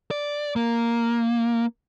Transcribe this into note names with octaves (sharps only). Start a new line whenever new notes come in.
D5
A#3